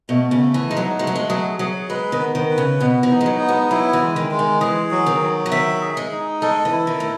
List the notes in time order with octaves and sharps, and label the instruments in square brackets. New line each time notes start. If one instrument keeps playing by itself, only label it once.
[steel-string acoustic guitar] B2 [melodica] A3
[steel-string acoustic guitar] C#3
[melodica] A3
[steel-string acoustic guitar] E3
[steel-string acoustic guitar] G#3 [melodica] D#4
[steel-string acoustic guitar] F#3
[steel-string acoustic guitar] G#3 [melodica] A3
[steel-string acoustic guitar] F#3
G#3
[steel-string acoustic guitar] F#3 [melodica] G#4
[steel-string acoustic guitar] F#3 [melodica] G#4
[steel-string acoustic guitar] G#3 [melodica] B4
[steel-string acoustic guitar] D#3
[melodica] B3
[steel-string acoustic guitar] D#3
[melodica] B4
[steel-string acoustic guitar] C#3
[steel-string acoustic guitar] B2 [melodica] B3
[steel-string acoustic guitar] E3
[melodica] D#4
[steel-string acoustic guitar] G#3
F#3
[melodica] B3
[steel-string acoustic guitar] G#3
[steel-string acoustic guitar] F#3 [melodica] E4
[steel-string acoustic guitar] E3
[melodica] G#3
[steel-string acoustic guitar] D#3
[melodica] G#3
[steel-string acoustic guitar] D#3
[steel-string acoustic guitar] E3 [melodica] G#4
[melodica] F#3
[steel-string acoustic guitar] D#3
[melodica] F#3
[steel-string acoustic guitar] E3
[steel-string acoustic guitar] D#3 [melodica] E5
[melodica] G#4
[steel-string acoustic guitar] G#3
[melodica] D#4
[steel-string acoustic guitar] G#3 [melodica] A4
[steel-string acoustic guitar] E3
[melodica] E4
[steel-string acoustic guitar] D#3
A2